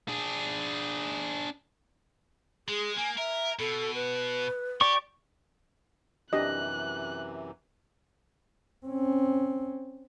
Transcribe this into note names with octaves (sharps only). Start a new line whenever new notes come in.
D4 G#4
G#3 G#4
A#3 G#5
A#4 E5
B2 A4
B4
G4 D5 C#6
F#2 C3 E3 D4 G4 D#5 F#6
C4 C#4